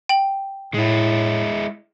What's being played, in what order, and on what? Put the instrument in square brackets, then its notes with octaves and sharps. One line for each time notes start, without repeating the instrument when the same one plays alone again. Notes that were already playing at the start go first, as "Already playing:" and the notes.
[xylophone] G5 F#7
[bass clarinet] A2 [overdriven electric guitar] G#3 E4